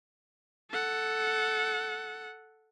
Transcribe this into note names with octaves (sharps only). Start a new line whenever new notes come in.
A4 F#5